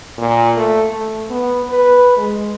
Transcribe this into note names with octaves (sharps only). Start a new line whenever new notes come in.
A#2
A3
A3
B3
B4
G#3